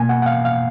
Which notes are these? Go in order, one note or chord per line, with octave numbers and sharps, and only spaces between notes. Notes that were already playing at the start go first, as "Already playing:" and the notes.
Already playing: B2 A#3 G#5
F#5
F#5
F5
F5